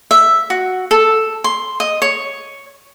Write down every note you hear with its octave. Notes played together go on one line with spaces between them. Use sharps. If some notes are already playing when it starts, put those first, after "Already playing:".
E5
F#4
A4
C6
D#5
C#5